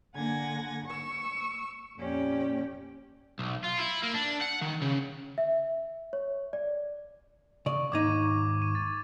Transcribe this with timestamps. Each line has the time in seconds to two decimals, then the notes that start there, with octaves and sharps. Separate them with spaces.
0.15 D3 A#3 F#5 G#5 G#6 A#6
0.84 C#6 E6
1.97 F2 A#2 C#4 G4 D5 G5
3.39 B1
3.64 F4
3.79 E4
4.03 A#3
4.15 D4
4.42 F#5
4.62 D#3
4.82 C#3
5.38 E5
6.13 C#5
6.53 D5
7.66 C#3 D5 C#6
7.92 D#2 G#2 D#4 D6 G#6 D#7
8.62 D#7
8.75 A6